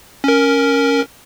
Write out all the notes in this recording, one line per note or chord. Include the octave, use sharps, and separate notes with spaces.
C#4 A#4